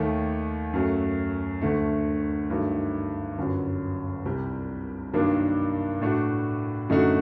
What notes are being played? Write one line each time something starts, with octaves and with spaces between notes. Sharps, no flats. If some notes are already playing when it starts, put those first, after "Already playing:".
Already playing: D#2 D#3 A3
F#2 F#3 A3
D2 D3 A3
G2 D#3 F#3 A3
G1 F#2 F#3
C2 C3 G3
G2 D#3 F#3 A#3 D4
A2 A3 D4 F#4
F#2 D3 A3 D#4 F#4